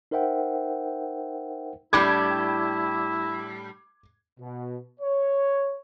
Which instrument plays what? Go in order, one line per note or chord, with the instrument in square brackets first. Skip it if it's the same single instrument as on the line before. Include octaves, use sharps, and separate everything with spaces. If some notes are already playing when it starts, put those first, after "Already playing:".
[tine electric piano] D#4 A#4 C5 E5 F#5 G5
[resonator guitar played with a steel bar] A2 G3 D4 [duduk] E4 [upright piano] D6 G#6
[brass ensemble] B2
C#5